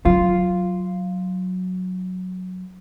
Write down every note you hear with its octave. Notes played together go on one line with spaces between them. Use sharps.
F#3 F4